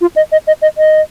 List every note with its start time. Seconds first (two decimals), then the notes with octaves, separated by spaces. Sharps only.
0.01 F4
0.16 D#5
0.32 D#5
0.47 D#5
0.62 D#5
0.78 D#5